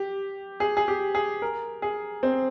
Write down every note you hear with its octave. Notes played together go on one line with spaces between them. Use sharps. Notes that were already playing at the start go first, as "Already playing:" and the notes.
Already playing: G4
G#4
G#4
G4
G#4
A#4
G#4
C4